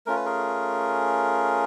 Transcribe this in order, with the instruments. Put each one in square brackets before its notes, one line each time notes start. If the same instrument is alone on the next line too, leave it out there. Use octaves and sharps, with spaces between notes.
[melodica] A3 C#4 F4 A#4
B4
G#4 A#4